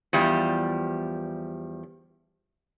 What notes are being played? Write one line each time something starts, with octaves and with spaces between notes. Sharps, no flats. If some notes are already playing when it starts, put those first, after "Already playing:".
E2 F3 G3